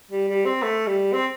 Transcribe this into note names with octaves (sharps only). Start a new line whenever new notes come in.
G3
G3
C4
A3
G3
C4